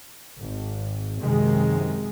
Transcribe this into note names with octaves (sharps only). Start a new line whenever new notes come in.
G#1
F#2 C3 D#3 G#3